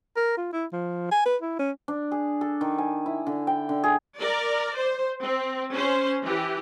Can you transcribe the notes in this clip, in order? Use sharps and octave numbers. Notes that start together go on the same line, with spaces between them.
A#4
F4
E4
F3
G#5
B4
E4
C#4
D4
G#4
A4
D#3
G#5
E4
D3
G5
D3
G#4
A#4 D5
C5
C4
C#4 C5
E3 G4